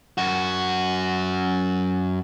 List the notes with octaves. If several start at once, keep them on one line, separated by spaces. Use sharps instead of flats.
F#2 F#4